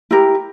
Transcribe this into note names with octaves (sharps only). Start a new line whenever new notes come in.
E4 G4 A#4